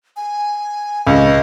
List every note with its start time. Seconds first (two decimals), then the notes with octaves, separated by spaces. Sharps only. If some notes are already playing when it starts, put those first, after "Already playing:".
0.16 G#5
1.07 C#2 D#5